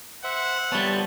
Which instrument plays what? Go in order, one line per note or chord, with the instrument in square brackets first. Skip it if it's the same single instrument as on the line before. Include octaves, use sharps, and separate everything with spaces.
[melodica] C5 E5 [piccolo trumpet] F#5
[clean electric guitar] G3 B3 [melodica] C#5 A5